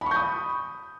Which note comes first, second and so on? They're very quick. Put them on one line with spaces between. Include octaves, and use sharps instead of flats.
B5 C#6 G6 D#6